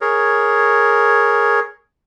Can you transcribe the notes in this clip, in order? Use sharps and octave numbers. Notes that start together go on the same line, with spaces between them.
G#4 A#4 C#5